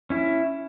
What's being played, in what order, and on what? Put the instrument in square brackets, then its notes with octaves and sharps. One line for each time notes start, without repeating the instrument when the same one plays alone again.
[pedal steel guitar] C#4 E4